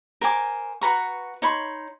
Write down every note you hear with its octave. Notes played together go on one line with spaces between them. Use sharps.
A#4 C5 G#5 D6
F#4 B4 A#5 C#6
D#4 C#5 B5 C6